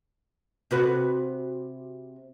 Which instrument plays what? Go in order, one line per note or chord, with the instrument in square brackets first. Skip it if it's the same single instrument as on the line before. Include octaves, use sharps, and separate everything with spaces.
[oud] C3 F#4 B4